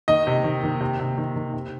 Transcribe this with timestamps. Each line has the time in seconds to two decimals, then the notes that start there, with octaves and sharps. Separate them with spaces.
0.08 D#3 D#5
0.27 C3
0.44 D#3
0.63 D#3
0.81 C3
1.00 C3
1.18 D#3
1.36 D#3
1.53 C3